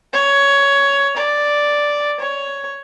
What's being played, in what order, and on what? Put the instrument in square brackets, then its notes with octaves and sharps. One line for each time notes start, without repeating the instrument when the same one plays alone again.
[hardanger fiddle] C#5
D5
C#5